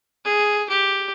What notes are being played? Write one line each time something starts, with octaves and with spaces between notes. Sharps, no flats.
G#4
G4